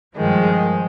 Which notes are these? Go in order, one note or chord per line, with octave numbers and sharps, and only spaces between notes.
G2 D#3 F3 G#3